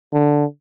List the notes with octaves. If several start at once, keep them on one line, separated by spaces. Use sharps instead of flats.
D3